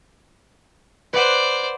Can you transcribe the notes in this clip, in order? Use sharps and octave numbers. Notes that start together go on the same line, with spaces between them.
B4 C5 D5 F#5